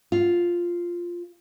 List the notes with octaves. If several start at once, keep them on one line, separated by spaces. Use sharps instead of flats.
F4